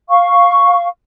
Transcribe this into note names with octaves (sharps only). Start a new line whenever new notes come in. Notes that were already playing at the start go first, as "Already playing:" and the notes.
F5 C#6